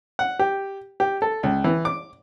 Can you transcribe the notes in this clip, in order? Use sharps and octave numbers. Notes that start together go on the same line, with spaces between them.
F#5
G4
G4
A4
C#2
E3
D6